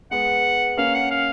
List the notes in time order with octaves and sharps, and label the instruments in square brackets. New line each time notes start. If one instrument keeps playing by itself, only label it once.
[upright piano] G#3 B3 [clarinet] F#5
[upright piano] A#3 C#4 [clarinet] F5
[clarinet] F#5
F5